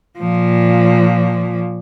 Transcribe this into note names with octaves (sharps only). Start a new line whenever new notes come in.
A#2 F3